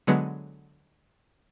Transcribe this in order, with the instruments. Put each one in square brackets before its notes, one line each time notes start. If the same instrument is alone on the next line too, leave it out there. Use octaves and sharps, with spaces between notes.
[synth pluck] D3 F#3 G#3 B3